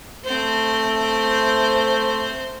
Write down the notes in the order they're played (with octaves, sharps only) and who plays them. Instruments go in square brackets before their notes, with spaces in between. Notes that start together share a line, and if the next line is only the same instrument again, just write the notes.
[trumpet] A3 [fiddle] C4 C5